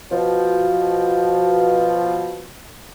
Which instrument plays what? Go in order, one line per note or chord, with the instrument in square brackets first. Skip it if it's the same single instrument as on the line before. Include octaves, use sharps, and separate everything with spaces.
[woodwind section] B2 F3